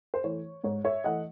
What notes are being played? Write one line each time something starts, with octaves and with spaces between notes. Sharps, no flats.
C5
E3 A3 C#5
G#2 C#5
C#5 E5
E3 A3 D#5 F#5